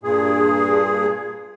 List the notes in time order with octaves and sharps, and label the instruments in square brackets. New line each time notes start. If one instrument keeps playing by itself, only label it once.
[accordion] G2 A#2 G#4